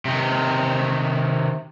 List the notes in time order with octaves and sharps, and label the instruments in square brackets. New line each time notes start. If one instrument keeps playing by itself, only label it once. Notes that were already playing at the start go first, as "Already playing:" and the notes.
[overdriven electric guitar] C3 D#3